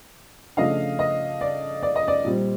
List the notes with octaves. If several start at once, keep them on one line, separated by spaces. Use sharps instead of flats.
C#3 F3 A3 D4 D#5 F5
D#5
D5
D5
D#5
D5
A#2 G3 C4